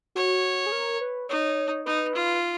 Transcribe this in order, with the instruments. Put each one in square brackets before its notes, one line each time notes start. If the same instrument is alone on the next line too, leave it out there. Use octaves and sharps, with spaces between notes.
[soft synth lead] F#4 [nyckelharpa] C#5
[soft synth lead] G#4
A#4
B4
[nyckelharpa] D#4 [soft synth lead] C#5
[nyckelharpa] D#4 [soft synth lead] B4
[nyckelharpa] F4